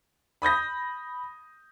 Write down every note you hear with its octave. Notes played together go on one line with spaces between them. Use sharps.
B5 D#6 G6 A#6